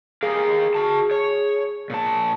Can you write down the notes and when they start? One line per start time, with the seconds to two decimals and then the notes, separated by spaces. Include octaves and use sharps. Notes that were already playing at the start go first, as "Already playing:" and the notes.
0.23 G4 G#4 A#4 F5
0.75 F#4 A5
1.11 C#5
1.90 A#2 A5